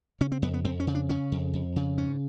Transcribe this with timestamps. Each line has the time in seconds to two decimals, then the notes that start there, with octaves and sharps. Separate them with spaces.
0.21 C#3 C#4
0.32 C4
0.42 F2 B3
0.54 B3
0.64 F2 C4
0.80 C#4
0.87 C#3
0.95 D4
1.09 C#3 C#4
1.32 F2
1.53 F2
1.76 C#3
1.97 G#2 C#4